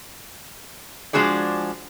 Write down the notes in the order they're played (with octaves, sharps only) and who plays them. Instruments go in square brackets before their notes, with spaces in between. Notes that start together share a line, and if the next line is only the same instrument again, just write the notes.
[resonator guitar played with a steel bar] F3 G#3 D4 F#4 G#4 D5